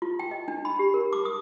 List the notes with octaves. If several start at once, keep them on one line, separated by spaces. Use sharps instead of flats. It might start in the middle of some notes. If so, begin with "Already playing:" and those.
F4
G5
D#5
D4
B5
G4
A#4
D6
D#6